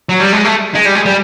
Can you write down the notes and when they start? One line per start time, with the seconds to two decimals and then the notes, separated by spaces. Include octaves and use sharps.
0.09 F#3
0.20 G3
0.33 G#3
0.45 A3
0.75 G#3
0.85 G3
0.95 G#3
1.06 G3